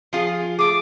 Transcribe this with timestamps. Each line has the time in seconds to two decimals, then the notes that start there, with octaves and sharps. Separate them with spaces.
0.13 F3 F4 G#4
0.59 A3 G#4 D6